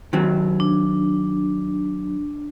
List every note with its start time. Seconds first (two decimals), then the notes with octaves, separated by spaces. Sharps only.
0.13 D#3 F#3 C4
0.60 D4